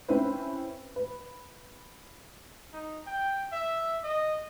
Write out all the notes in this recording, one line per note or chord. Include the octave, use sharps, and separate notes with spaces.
C4 C#4 E4 B4 C5
B4
D#4
G5
E5
D#5